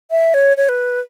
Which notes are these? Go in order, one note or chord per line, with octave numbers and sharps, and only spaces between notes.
E5
C#5
C#5
B4